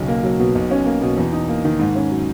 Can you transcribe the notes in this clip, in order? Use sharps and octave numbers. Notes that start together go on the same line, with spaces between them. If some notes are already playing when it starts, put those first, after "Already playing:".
Already playing: B1 C#3
A#3
F#3
B2
B1
C#4
A#3
B2
E2
D#4
A#3
D#3
G#2
C#4
F#3